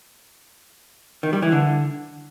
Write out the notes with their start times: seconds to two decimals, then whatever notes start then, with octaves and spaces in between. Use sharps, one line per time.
1.23 D#3
1.33 G3
1.42 E3
1.52 D3